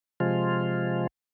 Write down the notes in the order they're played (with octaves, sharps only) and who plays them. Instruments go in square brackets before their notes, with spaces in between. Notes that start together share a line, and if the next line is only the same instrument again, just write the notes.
[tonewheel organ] C3 F3 G#3 F4